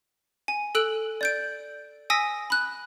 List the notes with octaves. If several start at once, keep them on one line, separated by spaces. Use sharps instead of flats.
G#5
A4 E6 F#6 D7 F#7
D5 G6 D7
G#5 D#6 E6 A#6 B6 D7
B5 F#6